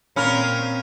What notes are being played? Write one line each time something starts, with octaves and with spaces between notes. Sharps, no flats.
A#2 C4 C#4 A#4 F5 B5 F6